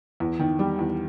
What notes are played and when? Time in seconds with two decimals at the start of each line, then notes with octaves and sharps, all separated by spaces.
0.20 E2
0.39 D#3
0.59 G3
0.79 E2